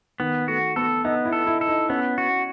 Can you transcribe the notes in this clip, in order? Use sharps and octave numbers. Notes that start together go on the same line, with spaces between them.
D#3 B3
A3 F#4
B3 A4
B3 D#4
E4
A4
E4
A4
D#4
B3 C#4
F#4